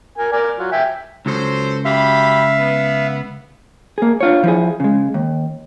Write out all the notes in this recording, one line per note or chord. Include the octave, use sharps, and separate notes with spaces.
A#4 G#5
A#4 D5 G#5
F#3 F4
E5 G5 G#5
C#2 F#3 A4 C5
F#2 G4 E5 F5 B5
B3
A#3 G#4
D4 F4 C#5
F3 E4 G#4
C#3 G#3
D#2